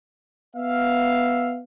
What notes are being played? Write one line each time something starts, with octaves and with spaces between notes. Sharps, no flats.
B3 E5 F5